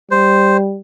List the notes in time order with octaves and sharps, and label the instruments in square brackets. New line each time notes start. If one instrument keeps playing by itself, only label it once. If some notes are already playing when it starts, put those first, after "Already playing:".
[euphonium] G3 [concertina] C5